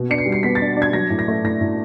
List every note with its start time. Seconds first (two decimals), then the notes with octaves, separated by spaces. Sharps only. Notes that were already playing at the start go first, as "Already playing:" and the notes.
Already playing: B2
0.10 D4 C#7
0.18 C7
0.26 G3
0.32 C7
0.43 B3 B6
0.55 A6
0.61 D4
0.76 D4
0.82 G#6
0.93 F#3 A#6
1.10 A2
1.19 A#6
1.28 A3
1.44 A2 A#6
1.61 A2